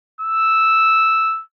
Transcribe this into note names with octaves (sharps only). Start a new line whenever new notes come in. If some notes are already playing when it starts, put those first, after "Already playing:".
E6